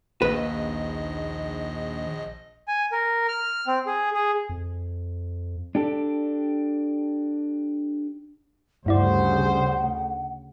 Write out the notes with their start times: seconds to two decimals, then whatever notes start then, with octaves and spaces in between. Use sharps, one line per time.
0.22 A#1 D#2 B4 D#5
2.68 G#5
2.92 A#4
3.29 F6
3.67 C4
3.86 G#4
4.14 G#4
4.49 F2
5.75 D4 G4 A4
8.86 D2 G2 C#3 G3 E4 C5 D5 F#5